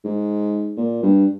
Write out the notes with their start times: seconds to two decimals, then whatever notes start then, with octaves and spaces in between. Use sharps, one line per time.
0.04 G#2
0.77 A#2
1.03 G2